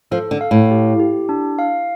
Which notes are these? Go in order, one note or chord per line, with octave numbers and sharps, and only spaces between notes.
F3 A4
D3
F5
A2
G4
G4
D4
F5